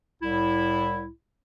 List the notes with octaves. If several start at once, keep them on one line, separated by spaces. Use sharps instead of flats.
C2 A2 E4